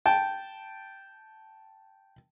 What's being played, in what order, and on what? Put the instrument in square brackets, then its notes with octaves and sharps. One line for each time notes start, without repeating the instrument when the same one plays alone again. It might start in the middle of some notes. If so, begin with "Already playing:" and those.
[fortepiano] G5 A5